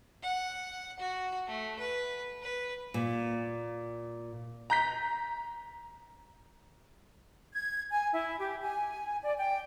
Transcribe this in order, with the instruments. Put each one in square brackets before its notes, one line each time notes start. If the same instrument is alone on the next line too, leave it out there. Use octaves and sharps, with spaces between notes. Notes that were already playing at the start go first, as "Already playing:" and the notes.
[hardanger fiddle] F#5
F#4
A3
B4
B4
[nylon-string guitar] A#2
[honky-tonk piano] A#5 G6 B6
[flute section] G#6
G#5
E4
G4
G#5
D5
G5